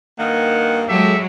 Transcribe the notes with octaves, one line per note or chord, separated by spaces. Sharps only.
G2 D#3 A#3 F#5
F#3 G#3 G4 A4 E5